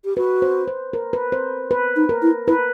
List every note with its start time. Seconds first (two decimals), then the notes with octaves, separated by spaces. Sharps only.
0.05 G4
0.17 F#4 B4
0.42 C5
0.67 C5
0.93 A#4
1.13 B4
1.32 C5
1.71 B4
1.96 D#4
2.09 A#4
2.22 E4
2.47 E4 B4